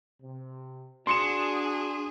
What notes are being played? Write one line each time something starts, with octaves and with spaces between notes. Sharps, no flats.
C3
D4 F#4 G#4 C6 C#7 E7